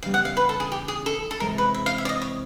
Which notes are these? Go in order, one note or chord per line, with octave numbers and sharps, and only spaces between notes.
C#3 E3 G3 B3 F5
F#5
F5
B4
A4
G#4
G4
G#4
A4
A4
C3 E3 G#3 C4 A#4
B4
E5
F5
E5
D5
D#5
C#5